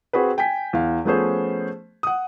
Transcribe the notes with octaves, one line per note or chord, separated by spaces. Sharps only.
C4 F#4 G#4 B4
G5 G#5 B6
E2 F5
F3 A3 B3 C#4 G#4 C5
F#5 D#6